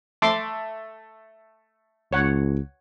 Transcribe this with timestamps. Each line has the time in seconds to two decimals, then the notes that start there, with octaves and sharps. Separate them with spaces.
0.22 A3 C6 D6
2.13 C#2 C#5 F#5